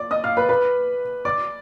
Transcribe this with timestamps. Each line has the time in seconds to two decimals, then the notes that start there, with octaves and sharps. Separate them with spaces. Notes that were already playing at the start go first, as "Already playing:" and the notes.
Already playing: D5 D6
0.11 D#5 D#6
0.24 F5 F6
0.37 B4 B5
0.49 B4 B5
1.25 D5 D6